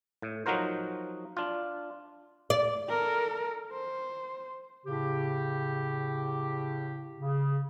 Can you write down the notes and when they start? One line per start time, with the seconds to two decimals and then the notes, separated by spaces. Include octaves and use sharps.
0.22 A2
0.46 F3 F#3 D#4 F#4 A#4 C5
1.37 D4 F4
2.50 D5
2.89 A4 A#4
3.72 C5
4.86 A2 C#3 G4
7.18 C#3